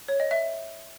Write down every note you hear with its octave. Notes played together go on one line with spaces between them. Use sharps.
C#5
D#5
E5